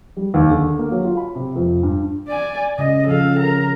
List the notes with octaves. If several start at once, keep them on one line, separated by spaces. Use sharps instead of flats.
G3
D#2
D3
A#3
F#3
F4
B5
C3
F2
G2
D5 G#5
C#3 D#5
C#3 F3 A4 F5
A#4 A#5